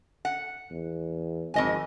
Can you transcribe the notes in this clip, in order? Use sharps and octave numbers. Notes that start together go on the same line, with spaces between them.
F#5
E2
G#1 F2 D#5 G#5